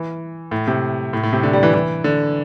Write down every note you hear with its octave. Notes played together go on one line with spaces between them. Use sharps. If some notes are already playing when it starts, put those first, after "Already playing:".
Already playing: E3
A2
C3
A2
A2
C3
D3
G3
E3
E3
D3